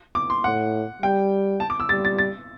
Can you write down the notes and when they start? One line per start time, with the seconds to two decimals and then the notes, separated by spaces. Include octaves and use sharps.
0.15 D6
0.30 C6
0.44 A2 F#5
1.02 G3 G5
1.60 A5
1.70 D6
1.80 E6
1.89 G3 A6
2.05 A6
2.18 A6